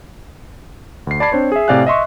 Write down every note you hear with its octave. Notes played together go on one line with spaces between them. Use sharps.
D2 C7
D5 A5 B5 G#6 C7
C4 D4 C5 C#5
G#4 E5
A2 C3 D5 F5 G#5 F#6
D#5 E5 C6 C#6